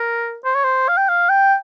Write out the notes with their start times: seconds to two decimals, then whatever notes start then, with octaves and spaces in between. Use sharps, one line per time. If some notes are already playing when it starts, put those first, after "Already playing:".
Already playing: A#4
0.44 C5
0.55 C#5
0.64 C5
0.88 F5
0.97 G5
1.08 F5
1.29 G5